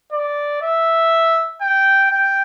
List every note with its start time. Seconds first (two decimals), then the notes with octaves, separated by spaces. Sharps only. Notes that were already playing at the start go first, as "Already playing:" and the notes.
0.12 D5
0.62 E5
1.62 G5
2.11 G5